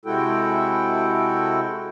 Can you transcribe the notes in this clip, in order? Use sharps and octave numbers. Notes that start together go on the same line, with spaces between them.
C3 G#3 E4 F#4 A4 G5